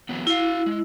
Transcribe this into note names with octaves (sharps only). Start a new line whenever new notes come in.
E3 F#3 B3
E4 F#4 F5
G#3